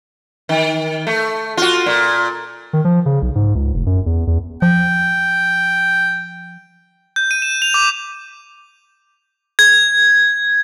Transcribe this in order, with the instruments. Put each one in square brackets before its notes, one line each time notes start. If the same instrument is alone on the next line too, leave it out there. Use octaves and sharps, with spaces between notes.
[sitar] D#3
A3
F4 F#4
A#2
[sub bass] D#3
F3
C#3
B1
G#2
C#2
F1
F#2
E2
E2
[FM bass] F3 [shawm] G5
[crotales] G6
D#7
E7
F7
D6
G#6